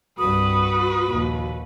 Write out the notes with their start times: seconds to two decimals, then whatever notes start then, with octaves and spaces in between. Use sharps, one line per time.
0.19 C2 G2 F#4 B4 D#6
1.06 A#1 D#2